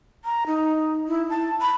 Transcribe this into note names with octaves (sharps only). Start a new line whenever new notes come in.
A#5
D#4
E4
A5
B5